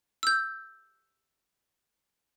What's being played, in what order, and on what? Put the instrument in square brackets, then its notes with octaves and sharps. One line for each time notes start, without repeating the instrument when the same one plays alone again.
[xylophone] E6 G6